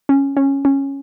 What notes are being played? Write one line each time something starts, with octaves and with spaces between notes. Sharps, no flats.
C#4
C#4
C#4